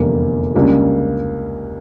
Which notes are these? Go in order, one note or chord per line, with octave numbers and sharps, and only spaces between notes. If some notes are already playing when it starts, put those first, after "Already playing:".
Already playing: F1 E2 D3 G3 A#3
C#2 C#3 G3 A#3 D4